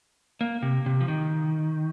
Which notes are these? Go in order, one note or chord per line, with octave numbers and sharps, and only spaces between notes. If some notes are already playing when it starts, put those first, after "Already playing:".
A#3
C3
C3
F3
D#3